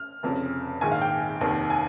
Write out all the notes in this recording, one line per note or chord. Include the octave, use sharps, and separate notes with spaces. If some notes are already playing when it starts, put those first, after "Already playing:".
Already playing: F6
F1 F2 C#3
A#1 G#2 D#3 G#5
F5
G5
F1 D#2 D#3
G#5